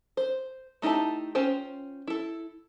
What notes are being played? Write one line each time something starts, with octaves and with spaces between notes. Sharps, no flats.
C5
A3 D#4 E4 G4 A5
C#4 F4 C5 G5
E4 A4